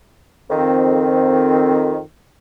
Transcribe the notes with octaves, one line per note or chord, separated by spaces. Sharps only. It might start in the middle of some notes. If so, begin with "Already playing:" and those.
F2 D#3 C4